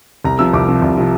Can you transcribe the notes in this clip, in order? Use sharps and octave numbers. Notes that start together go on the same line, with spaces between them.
C2 A#5
C3 F3 E6
C2 D6
C3 F3
C2
C3 F3